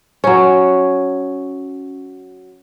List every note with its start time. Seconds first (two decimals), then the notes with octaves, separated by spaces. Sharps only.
0.24 F#3 C#4